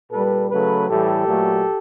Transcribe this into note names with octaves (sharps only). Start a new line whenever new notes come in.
A#2 G3 A4 B4
C#3 F#3 A3 A4 B4
A2 E3 G3 G4 A4
A#2 F#3 A3